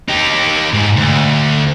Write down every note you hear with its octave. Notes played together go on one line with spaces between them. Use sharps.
D#4 G4
G#2
D2